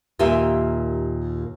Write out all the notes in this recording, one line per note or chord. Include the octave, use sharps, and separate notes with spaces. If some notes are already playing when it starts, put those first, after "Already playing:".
D#2 A#2 G4 E5 G#5